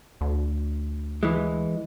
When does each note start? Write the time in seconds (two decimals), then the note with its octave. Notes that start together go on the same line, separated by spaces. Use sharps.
0.21 D2
1.23 E3 G#3